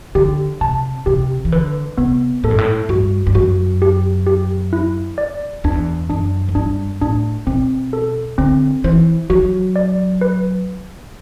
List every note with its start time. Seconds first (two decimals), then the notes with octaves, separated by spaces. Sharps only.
0.15 D3 G4
0.61 C3 A5
1.06 C3 G4
1.45 E3
1.52 D3 B4
1.98 C3 B3
2.44 A2 A4
2.51 G2
2.58 A2
2.89 G2 F#4
3.27 G2
3.35 F#2 F#4
3.82 G4
4.27 G4
4.73 E4
5.18 D5
5.64 E2 D4
6.10 F#2 D4
6.49 F#2
6.55 G2 D4
7.01 A2 D4
7.47 B2 C4
7.93 A4
8.38 D3 C4
8.84 E3 C5
9.30 F#3 F#4
9.76 D5
10.21 B4